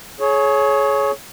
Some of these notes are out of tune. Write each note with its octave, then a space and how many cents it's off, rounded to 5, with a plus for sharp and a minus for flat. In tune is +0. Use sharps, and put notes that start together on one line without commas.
G#4 +30 C#5 +0